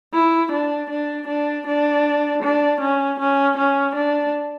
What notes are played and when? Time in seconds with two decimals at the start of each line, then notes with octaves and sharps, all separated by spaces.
0.14 E4
0.52 D4
0.90 D4
1.27 D4
1.67 D4
2.43 D4
2.81 C#4
3.19 C#4
3.57 C#4
3.95 D4